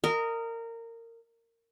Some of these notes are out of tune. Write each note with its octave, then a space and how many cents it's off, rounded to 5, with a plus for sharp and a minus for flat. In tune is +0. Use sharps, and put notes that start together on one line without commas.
A#4 -20 D#5 +0